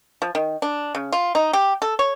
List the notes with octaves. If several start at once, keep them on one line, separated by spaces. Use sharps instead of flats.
F3
D#3
D4
C#3
F4
D#4
G4
A4
C#5